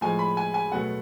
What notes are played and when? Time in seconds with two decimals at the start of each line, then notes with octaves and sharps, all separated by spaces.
0.01 A2 F3 G#3 G#5
0.19 B5
0.37 G#5
0.54 G#5
0.72 B2 F#3 A3 F#5